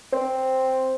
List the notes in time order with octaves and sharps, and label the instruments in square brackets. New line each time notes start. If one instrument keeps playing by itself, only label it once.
[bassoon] C4